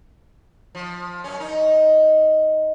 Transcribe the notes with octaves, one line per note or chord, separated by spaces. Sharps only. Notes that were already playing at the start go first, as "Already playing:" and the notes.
F3
F#2 C#4
D#4